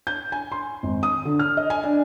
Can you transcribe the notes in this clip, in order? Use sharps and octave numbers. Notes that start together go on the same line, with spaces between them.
G6
G#5
C6
G#1
D#6
D3
F6
D#5
G#5
D4